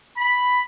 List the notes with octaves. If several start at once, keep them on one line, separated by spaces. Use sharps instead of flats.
B5